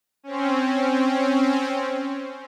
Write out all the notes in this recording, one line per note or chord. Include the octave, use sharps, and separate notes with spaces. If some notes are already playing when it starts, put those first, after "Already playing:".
C4 C#4